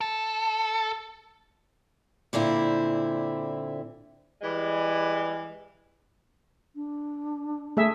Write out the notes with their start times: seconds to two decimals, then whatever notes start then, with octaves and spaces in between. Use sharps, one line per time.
0.01 A4
2.33 A#2 D3 C4 E4
4.41 E3 G3 G#3
6.74 D4
7.77 A3 G#4 E5